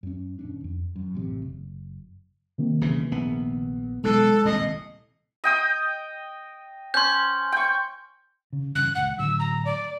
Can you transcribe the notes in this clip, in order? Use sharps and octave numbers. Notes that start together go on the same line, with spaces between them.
F#2 C#4
D#1 C#4 D4
F2
F#2
A1 C3
F#1
C3 D#3 A#3
B1 C#3 E3
A#1 B3
E1 B1 B2 G#3 A4 F#6
D#1 C2 A2 D#5
D#5 G5 D#6
C#4 C6 G6
G5 C#6
C#3
G2 C#3 E3 F#6
D#1 C#2 F#5
A2 D3 F#3 E6
A#5
D5